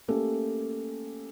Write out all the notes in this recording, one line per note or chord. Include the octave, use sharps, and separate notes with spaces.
A3 A#3 C#4 G4 A4